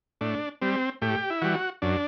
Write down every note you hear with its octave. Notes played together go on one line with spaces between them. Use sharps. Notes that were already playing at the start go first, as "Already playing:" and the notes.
A2 D4
G3 C4
A2 G4
E4
E3 G3 F#4
F#2 D4